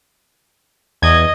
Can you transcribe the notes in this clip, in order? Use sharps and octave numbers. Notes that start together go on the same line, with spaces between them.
E2 D#5 G#6